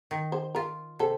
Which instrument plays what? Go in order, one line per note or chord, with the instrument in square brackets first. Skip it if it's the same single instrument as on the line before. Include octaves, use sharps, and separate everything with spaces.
[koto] D#3
[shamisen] C5
[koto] F4 [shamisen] A#4
[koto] C3 [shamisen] A4